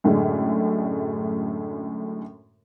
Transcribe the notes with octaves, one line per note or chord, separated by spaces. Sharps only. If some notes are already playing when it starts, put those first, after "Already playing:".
F#2 A2 D3 G#3